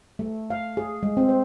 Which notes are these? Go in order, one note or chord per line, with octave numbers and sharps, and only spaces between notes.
A3
F5
G#4
G#3
C4
C5